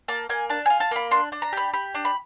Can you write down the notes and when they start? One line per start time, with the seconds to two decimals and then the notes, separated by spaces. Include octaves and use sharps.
0.08 A#3 A5
0.29 A#3 G#5
0.49 D4 A5
0.66 F4 G#5
0.80 A5
0.91 A#3 B5
1.11 D4 C6
1.32 D4
1.42 A#5
1.53 G4 B5
1.74 G4 B5
1.94 D4
2.05 B5